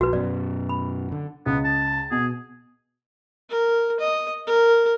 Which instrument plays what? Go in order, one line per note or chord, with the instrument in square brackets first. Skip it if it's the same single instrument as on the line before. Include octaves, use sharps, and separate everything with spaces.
[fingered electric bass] A#1 [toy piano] F#4 B4
[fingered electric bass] F#2 B2 [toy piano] D5
[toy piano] B5
[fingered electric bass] D3
[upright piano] C#2 [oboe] B3
[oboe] A5
[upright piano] B2 [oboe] G#4
[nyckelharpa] A#4
D#5
A#4